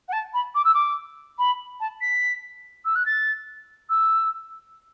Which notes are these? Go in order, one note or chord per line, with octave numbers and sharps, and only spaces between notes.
F#5
A5
B5
D6
E6
D6
B5
A5
B6
E6
F#6
A6
E6